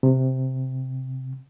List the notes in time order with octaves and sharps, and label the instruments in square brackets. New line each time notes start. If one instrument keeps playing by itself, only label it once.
[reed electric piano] C3